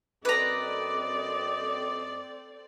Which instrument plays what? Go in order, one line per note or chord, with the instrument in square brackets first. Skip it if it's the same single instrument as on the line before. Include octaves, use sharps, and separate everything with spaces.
[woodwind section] F#2 D#5 D6 [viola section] C4 A4 D5 [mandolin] B4 A#5